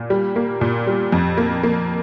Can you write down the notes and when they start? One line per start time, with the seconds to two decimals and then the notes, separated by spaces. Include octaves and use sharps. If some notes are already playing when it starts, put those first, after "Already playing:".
Already playing: A#2
0.10 G3
0.36 A#3
0.61 A#2
0.87 G3
1.12 F2
1.38 A#3
1.63 A#3